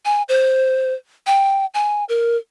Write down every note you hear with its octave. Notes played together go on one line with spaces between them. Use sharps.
G#5
C5
G5
G#5
A#4